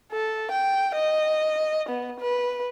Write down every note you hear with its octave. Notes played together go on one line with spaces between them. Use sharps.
A4
G5
D#5
B3
B4